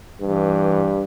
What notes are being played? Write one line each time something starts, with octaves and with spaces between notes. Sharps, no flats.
G2 E3